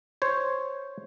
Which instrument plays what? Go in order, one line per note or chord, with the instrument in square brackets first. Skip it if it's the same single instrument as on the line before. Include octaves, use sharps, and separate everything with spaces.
[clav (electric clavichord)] C5 C#5